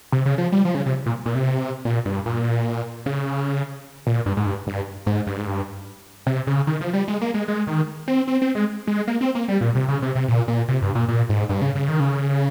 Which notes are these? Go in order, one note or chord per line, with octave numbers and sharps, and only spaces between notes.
C3
C#3
F3
G3
F3
C#3
C3
A#2
A#2
C3
A#2
G2
A#2
C#3
A#2
G2
G#2
G2
G2
G#2
G2
G#2
G2
C3
C#3
D#3
F3
G3
G#3
A#3
G#3
G#3
D#3
C4
C4
C4
G#3
G#3
A#3
C4
A#3
G3
A#2
C3
C#3
C3
C3
A#2
A#2
C3
G2
A#2
A#2
G#2
G2
C#3
C#3
D#3
C#3